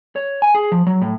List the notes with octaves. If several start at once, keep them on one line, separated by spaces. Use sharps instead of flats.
C#5
G#5
G#4
F3
F#3
A2